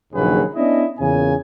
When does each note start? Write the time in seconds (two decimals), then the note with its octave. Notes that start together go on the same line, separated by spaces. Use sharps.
0.14 A#1 D#2 C#3 F#3 G#4 B4
0.55 B3 C#4 D4 E4 D#5
0.99 E2 A#2 C#3 G#5